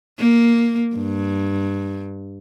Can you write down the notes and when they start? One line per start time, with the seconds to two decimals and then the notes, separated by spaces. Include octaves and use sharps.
0.19 A#3
0.95 G2